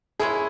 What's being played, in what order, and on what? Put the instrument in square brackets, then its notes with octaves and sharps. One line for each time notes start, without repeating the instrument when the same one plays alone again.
[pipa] G#3 C#4 E4 [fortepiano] G#4